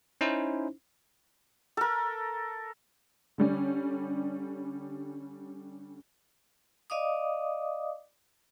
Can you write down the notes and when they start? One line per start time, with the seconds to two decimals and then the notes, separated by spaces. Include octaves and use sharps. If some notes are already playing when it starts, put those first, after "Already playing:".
0.21 C#4 D#4 E4 C5
1.77 A4 A#4
3.38 D3 G3 C#4
6.90 D5 D#5 F5 D6 D#6